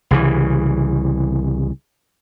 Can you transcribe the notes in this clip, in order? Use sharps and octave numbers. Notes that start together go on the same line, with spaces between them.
C2 C#3 E3